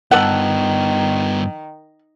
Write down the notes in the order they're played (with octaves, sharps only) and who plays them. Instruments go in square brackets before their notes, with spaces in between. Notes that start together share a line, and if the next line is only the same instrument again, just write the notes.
[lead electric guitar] G2 B3 [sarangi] D#3 [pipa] A4 F#5